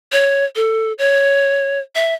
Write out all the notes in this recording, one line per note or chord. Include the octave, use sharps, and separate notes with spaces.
C#5
A4
C#5
E5